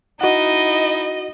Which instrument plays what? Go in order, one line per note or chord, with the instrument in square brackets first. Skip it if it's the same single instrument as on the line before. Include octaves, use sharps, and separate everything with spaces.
[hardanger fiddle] D#4 E4 [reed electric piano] F#4 F#5 [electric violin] D#5